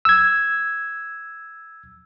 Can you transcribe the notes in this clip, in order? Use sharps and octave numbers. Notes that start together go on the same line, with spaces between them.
E6 G#6